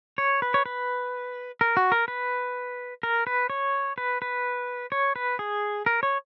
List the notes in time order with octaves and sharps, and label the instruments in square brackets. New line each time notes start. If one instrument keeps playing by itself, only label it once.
[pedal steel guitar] C#5
B4
C#5
B4
A#4
F#4
A#4
B4
A#4
B4
C#5
B4
B4
C#5
B4
G#4
A#4
C#5